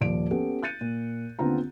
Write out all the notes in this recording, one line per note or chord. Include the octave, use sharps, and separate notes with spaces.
D#1 F3 D5 D7
B3 C#4 G4 A4
F#6 G6 A6 C#7 D#7
A#2
D#2 D3 B3 C4 F4 A#5